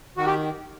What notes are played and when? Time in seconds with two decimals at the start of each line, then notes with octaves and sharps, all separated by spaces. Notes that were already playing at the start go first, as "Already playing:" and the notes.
0.17 D#3 F#4
0.26 G4